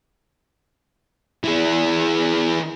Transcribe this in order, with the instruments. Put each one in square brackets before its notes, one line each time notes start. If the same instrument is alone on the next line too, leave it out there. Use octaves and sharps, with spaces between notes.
[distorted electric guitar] E3 G#4